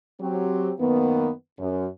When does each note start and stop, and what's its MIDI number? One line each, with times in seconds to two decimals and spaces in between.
0.20 0.70 54
0.20 0.70 60
0.20 0.70 67
0.78 1.29 42
0.78 1.29 51
0.78 1.29 58
0.78 1.29 59
1.59 1.86 42